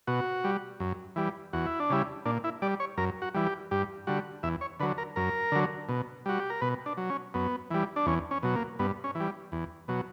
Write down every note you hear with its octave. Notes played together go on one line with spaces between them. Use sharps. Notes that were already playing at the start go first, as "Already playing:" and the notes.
B2 F#4
G3
F#2
E3 G3
E2 F#4
E4
D4
C#3 G3 E4
A#2 D4
E4
G3 D5
C#5
F#2 A#4
F#4
E3 G3
G4
G2 G4
D3 G3 F#4
E2 E5
C#5
D3 F#3 B4
A#4
F#2 A#4
D3 F#3
B2
G3 F#4
G4
A#4
B2 B4
D4
F#3
C#4
F#2 B3
E3 G3
D4
E2 C#4
C#4
B2 F#3
A#3
G2 B3
C#4
E3
G3
E2
B2 F#3